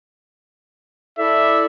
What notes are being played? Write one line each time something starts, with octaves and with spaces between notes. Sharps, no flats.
E4 A4 D5 E5